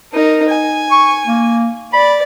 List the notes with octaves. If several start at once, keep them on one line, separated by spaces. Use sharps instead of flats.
D#4 A#4
G#5
C#6
A#3
D5 B5